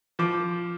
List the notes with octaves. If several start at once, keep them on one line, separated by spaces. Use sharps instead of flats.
F3 D6